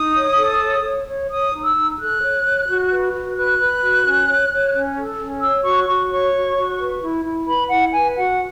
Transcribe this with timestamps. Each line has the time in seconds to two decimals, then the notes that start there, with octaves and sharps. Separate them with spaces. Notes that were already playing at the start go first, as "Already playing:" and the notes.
Already playing: D#4 D#6
0.15 C#5
0.38 A4
0.61 C#5
0.84 C#5
1.07 C#5
1.30 C#5 D#6
1.53 D#4
1.64 E6
1.75 D#4
1.98 A4 F#6
2.22 C#5
2.45 C#5
2.68 F#4
2.90 B4
3.13 F#4
3.36 B4 F#6
3.59 B4
3.81 F#4
4.04 C#4
4.27 C#5
4.50 C#5
4.73 C#4
4.96 A4
5.18 C#4
5.41 C#5 E6
5.64 F#4 C#6
5.87 F#4 C#6
6.10 C#5 C#6
6.33 F#4
6.56 F#4
6.79 B4
7.02 E4
7.25 E4
7.47 B4 B5
7.69 E4 F#5
7.92 B4 G#5
8.16 F#4 F#5